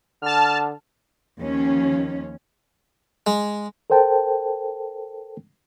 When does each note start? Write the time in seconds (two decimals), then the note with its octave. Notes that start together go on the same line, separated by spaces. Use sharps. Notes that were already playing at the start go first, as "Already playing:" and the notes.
0.22 D3 A5 F6
1.40 D#2 F3 C#4
3.27 G#3
3.90 A4 A#4 C5 G5 A5